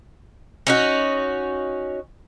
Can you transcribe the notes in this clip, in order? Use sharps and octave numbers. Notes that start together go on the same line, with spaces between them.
C#4 D#4 F#4